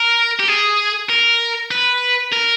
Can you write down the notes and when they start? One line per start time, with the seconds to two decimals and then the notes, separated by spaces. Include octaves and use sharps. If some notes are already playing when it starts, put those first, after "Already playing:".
Already playing: A#4
0.39 G4
0.48 G#4
1.10 A#4
1.71 B4
2.32 A#4